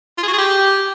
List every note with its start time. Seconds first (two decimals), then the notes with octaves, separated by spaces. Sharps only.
0.18 F4
0.23 G#4
0.28 F#4
0.33 G#4
0.38 G4